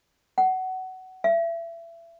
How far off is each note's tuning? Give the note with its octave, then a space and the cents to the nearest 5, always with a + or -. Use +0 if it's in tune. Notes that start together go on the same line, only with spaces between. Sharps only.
F#5 +20
E5 +30